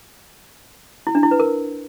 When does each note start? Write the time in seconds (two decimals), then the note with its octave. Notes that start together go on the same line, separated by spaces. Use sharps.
1.07 E4
1.15 D4
1.23 E4
1.31 B4
1.40 A#4